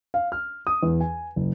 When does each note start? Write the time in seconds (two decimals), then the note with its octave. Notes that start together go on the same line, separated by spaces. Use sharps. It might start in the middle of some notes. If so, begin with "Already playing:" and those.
0.14 F5
0.32 F6
0.67 D#6
0.83 E2
1.01 G#5
1.36 F#1